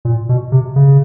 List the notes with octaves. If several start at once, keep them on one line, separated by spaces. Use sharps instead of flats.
A#2
B2
C3
C#3